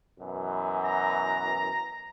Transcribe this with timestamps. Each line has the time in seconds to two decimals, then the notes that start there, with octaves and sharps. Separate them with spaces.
0.19 F#2 B2 E3
0.85 A#5